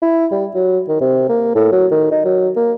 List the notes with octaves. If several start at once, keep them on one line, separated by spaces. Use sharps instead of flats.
E4
G3
F#3
D#3
C3
A#3
A2
F#3
D#3
D#4
F#3
A#3